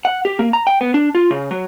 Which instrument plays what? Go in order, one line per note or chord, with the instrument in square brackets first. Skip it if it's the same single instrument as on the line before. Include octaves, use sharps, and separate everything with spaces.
[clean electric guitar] F#5
G4
A#3
A#5
G5
B3
D4
F4
C#3
F#3